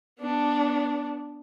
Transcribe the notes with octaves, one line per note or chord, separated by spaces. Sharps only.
B3 D4